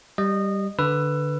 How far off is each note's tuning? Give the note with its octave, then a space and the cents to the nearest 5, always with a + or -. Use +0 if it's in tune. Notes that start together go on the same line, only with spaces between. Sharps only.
G3 +0 D#5 -20
D3 +0 B4 +0 E6 +25